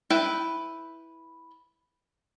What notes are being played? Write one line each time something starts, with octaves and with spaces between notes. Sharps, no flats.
E4 B4 G5